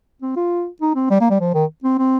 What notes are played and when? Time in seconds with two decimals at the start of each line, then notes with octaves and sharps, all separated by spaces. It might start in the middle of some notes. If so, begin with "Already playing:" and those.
0.22 C4
0.36 F4
0.81 D#4
0.95 C4
1.10 G3
1.20 A#3
1.30 G3
1.40 F3
1.54 D#3
1.84 C4
1.98 C4